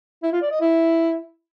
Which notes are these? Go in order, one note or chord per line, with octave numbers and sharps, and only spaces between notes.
E4
F4
D5
D#5
E4